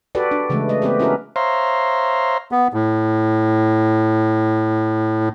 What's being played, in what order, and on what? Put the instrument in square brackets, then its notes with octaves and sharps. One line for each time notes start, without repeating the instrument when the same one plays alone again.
[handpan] F#4 G4 A4 B4 D5
D4
C#3 E3 G#3 A3
A3 D#5
A3 B3 C4 G4 B4
C#4 E4 F#4 A#4 B4
[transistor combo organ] C5 C#5 E5 F5 A#5 C6
[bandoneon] B3
A2